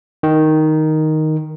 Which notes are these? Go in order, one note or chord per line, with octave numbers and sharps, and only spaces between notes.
D#3